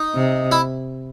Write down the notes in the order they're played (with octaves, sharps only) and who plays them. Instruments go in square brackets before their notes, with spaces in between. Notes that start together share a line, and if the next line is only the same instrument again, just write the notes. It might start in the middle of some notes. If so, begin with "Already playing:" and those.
Already playing: [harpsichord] D#4
[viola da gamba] C3
[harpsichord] E4